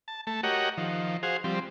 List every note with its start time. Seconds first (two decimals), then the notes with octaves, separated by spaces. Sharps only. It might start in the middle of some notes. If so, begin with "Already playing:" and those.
0.08 A5
0.27 A3 A5
0.43 F#4 G4 A#4 C#5 D#5 F#5
0.78 D#3 F3
1.23 F#4 G#4 C5 F5
1.44 F3 G3 C4